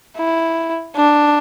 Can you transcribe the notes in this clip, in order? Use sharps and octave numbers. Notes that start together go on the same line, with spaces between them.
E4
D4